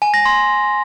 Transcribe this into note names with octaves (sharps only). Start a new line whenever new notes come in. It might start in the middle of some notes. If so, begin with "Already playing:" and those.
G#5
A#6
C6